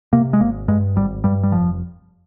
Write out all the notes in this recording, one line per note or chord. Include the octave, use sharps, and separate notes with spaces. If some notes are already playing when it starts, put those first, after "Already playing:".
C3 A#3
G#3
G#1 A#3
G2 G#3
G#1 G3
G2 G3
G3
F1 F3